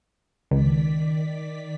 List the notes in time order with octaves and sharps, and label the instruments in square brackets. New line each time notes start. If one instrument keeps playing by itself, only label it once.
[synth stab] C#2 [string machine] D#3 D5 B6